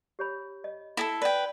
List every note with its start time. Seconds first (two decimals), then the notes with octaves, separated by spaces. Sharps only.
0.19 G4 C#5 B5
0.64 D#5
0.97 E4 G#4 A4
1.22 B4 D5 G5